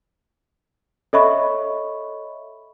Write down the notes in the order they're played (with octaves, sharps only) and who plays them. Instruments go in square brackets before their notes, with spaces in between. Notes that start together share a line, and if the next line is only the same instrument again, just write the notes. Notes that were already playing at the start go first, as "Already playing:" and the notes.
[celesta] A4 C#5 D#5 E5 B5 C#6